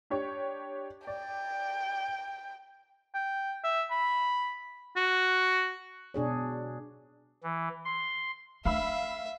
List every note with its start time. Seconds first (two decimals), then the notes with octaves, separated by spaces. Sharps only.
0.10 D4 G4 C#5
1.07 D5 G5
3.14 G5
3.64 E5
3.91 B5
4.96 F#4
6.14 B2 D4 G#4 C#5
7.43 E3
7.85 C6
8.65 A3 D4 E5 F5 B5 E6